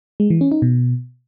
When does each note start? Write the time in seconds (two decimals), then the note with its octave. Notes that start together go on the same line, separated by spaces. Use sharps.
0.20 G#3
0.30 E3
0.41 C#4
0.52 D#4
0.62 B2